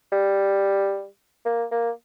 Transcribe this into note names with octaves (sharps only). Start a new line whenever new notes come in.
G3
A#3
A#3